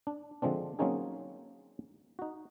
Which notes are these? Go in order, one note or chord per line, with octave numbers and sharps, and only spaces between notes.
D4
D3 F3 G#3 C4 D4
F#3 A#3 C4 C#4 D#4 G#4
D#4 F#4